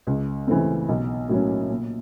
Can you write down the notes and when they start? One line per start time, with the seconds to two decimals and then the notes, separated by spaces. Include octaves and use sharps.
0.07 C#2
0.47 C#3 E3 A3 C4
0.89 B1
1.29 A2 F#3 A#3 C#4
1.70 A#2